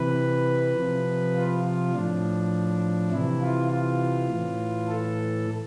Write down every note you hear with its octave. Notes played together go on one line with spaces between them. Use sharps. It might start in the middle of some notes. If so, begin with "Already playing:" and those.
Already playing: C3 E3 B4
C3 F3
F4
F4
A2 F3 D4
C3 E3 E4
F4
F4
A2 E3
A4